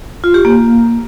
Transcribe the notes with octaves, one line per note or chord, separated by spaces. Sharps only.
F4
G4
A#3